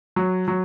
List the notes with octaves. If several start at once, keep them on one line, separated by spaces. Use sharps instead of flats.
F#3
F#3